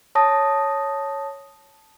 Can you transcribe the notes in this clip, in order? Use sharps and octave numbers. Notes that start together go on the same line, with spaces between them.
C#5 A5 D#6 A#6